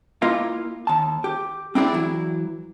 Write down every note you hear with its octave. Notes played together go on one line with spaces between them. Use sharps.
A#3 E4 F4 A#4 D#5 F5
D#2 A5
G4
C4 D4 E4 G4 G#4 D5
E3 F#3 E4